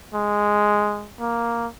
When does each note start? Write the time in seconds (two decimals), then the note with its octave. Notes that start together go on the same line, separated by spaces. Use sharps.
0.14 G#3
1.20 A#3